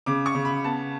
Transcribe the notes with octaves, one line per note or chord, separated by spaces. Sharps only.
C#3 D6
C#6
C#3
B5
B3 A5